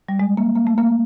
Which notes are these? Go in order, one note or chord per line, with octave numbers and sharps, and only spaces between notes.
G3
G#3
A#3
A#3
A3
A#3